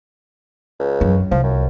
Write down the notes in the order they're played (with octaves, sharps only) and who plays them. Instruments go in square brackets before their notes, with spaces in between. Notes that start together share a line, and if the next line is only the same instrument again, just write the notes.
[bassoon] C#2
[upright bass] F#2
[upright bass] C2 [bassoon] F3
[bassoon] F#2